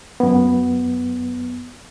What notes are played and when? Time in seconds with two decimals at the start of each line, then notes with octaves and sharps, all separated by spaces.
0.20 F#2 B3